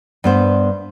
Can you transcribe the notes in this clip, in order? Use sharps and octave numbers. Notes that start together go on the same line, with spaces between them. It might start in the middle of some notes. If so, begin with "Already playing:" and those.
G2 B3 C5